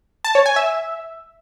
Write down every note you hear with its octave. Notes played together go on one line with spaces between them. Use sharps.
A5
C#5
G#5
E5